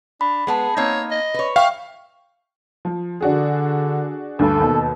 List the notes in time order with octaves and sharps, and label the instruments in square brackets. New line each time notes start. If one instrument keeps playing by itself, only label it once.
[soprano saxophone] D4 [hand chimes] B5
[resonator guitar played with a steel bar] G#3 B3 A5 [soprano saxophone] G#4
[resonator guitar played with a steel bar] A#3 C4 D#4 [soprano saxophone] C#5
[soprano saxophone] D#5
[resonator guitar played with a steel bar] B4 C#5
[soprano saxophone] E5 [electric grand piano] F5 [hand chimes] G5 C#6
[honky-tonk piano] F3
[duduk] D3 [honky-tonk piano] D4 F#4 G#4
[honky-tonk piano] D2 G2 [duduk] A4
[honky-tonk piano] D#2 B2